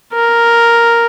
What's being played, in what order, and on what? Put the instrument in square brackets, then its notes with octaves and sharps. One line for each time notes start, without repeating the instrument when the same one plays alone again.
[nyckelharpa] A#4